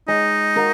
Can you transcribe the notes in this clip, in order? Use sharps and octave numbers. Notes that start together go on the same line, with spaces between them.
G#3 D#4
F#4 A#4